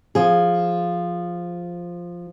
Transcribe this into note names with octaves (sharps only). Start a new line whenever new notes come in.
F3 G#4